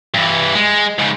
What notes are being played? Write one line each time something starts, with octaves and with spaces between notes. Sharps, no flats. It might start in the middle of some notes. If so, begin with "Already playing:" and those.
G2 E3
G#3
G#2 C#3